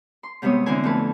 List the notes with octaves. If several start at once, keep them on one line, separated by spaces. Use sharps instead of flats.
C6
G#2 C3 G3 B3 C#5 D#6
D3 E3 C4 E4 C5 G#5
F2 A3 B4